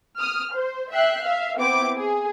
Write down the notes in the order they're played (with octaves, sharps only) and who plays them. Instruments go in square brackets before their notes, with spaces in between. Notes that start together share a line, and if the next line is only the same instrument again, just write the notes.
[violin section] D#6 F6
C5
E5 G5 F#6 C7
E5 F5
B3 C4 E4 D6
G#4